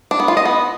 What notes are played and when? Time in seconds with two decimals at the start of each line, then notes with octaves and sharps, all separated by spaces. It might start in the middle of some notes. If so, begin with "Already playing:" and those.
0.11 D4
0.20 B3
0.28 F4
0.37 D#5
0.45 B3